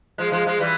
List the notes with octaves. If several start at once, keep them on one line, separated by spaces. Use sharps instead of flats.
F3 G#3
F3 G#3
F3 G#3
E3 G3